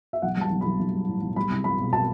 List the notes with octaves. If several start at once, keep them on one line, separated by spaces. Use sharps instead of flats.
E5
B1 F#5
G3 A5
B1
B1 B5
B1
G3
A2
B1
G3 B5
C2
G3 B5
B2
B2 A5